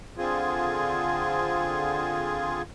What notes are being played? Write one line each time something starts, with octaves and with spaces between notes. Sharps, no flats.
D3 C4 F4 G#4